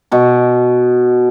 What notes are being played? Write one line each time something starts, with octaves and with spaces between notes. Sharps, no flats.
B2 C#6